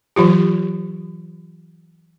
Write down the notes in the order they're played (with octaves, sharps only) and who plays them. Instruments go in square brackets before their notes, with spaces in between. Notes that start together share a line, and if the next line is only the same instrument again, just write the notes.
[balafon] E3 F#3 F4 G4